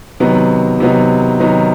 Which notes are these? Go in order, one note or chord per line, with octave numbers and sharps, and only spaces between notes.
C3 D#3 F#3 B3 D#4
C3 D#3 F#3 B3 D#4
C3 D#3 F#3 B3 D#4